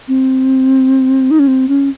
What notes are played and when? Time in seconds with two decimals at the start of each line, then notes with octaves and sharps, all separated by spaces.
0.08 C4
1.31 D#4
1.39 C#4
1.47 C4
1.68 C#4